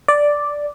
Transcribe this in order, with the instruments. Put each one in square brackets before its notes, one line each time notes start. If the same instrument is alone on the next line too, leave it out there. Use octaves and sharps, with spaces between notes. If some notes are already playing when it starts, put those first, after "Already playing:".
[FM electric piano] D5